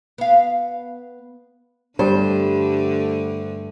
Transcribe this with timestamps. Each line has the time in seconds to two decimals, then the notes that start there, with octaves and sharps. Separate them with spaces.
0.18 B3 F5
1.99 G2 D3 A3 C5